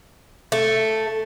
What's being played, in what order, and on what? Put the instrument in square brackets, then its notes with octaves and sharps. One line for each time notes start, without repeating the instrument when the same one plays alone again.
[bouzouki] A3